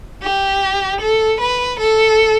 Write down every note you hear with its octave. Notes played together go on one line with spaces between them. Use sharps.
G4
A4
B4
A4